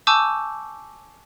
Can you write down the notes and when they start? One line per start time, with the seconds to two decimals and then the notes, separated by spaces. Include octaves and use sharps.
0.07 G#5 A5 C#6 D6 E6 G6